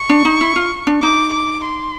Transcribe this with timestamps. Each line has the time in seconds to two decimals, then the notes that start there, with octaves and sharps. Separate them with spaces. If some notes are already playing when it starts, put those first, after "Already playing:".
Already playing: C#6
0.09 D4
0.25 D#4
0.41 E4
0.56 F4
0.87 D4
1.02 D#4 D6
1.34 D6
1.66 C6